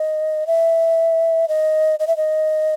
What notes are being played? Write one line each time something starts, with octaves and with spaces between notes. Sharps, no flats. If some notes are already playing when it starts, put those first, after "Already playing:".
Already playing: D#5
E5
D#5
D#5
E5
D#5